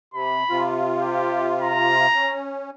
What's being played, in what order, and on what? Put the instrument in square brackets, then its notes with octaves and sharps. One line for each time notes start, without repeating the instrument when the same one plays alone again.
[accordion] C3 [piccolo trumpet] B5
[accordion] C3 F4
[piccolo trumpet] G4
A#5
[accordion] C#4